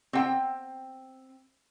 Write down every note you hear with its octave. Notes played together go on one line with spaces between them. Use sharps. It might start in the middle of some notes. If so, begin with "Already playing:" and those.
C4 G5